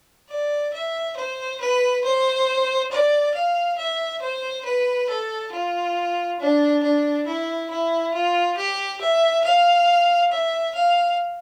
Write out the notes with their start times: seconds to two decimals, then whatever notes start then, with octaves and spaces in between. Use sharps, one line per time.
0.30 D5
0.74 E5
1.17 C5
1.60 B4
2.04 C5
2.91 D5
3.34 F5
3.78 E5
4.22 C5
4.65 B4
5.09 A4
5.52 F4
6.39 D4
6.83 D4
7.26 E4
7.70 E4
8.14 F4
8.57 G4
9.01 E5
9.44 F5
10.31 E5
10.75 F5